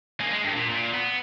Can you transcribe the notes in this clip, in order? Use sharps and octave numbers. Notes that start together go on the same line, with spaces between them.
A#3 G#4
G#3
G2 D#3
A#2
A#2
B3